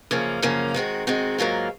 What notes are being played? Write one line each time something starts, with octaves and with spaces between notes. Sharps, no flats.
F#2 C#3 F3 A#3 C#4
F#2 C#3 F3 A#3 C#4
D#3 G#3 C4 F#4
D#3 G#3 C4 F#4
G#2 F#3 A#3 F4 A#4